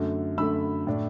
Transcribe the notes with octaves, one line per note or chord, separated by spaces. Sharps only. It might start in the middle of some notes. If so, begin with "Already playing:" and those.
Already playing: F#2 D3 A3
F#2 D3 A3 B5 E6
A2 A3 D4